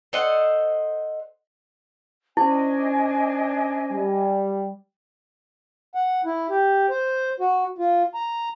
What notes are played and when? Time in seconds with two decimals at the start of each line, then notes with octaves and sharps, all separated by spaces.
0.13 A4 C5 D#5 F#5
2.37 C#4 D4 E4 C5 D#5 G#5 D6
3.92 G3
5.95 F#5
6.25 E4
6.50 G4
6.90 C5
7.40 F#4
7.78 F4
8.15 A#5